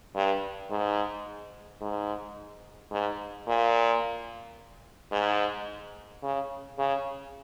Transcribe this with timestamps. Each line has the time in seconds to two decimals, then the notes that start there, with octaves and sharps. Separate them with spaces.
0.15 G2
0.70 G#2
1.81 G#2
2.91 G#2
3.47 A#2
5.12 G#2
6.23 C#3
6.78 C#3